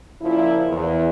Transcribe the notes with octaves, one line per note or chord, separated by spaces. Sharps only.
A#2 C#3 F3 E4
E2